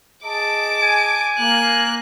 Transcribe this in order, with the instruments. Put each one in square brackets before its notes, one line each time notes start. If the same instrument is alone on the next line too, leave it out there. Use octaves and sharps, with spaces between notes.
[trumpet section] G#4 D#5 A5 [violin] D6 D7
[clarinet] G#5
[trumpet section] A#3 [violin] F#6